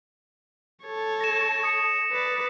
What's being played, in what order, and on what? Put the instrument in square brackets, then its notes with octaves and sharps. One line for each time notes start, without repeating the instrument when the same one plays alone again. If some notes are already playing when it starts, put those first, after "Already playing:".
[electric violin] A4 C#5
[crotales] A#6 E7
D#6 C#7
[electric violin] B4 D5